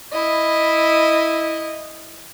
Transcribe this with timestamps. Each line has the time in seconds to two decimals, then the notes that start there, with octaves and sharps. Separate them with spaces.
0.12 E4 D#5